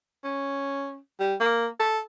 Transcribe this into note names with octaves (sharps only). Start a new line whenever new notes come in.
C#4
G3
A#3
A4